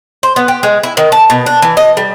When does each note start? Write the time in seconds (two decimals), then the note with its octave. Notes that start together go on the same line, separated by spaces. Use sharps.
0.23 C5
0.36 B3
0.48 G4
0.63 G#3
0.83 E4
0.97 D#3
1.12 A5
1.30 B2
1.46 D4
1.62 E3
1.77 D#5
1.97 G3